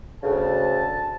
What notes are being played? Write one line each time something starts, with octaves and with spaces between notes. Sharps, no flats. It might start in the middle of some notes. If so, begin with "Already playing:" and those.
D2 C#3 A5